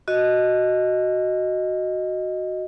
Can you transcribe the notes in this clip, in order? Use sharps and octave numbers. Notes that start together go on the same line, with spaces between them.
F#4 D#5